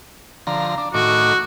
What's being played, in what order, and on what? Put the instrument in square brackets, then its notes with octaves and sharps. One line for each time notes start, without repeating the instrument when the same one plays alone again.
[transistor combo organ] D3 F3 A#5
D4
[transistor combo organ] A2 D#3 D6 [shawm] F#4